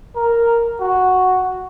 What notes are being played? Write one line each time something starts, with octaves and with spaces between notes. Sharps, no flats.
A#4
F#4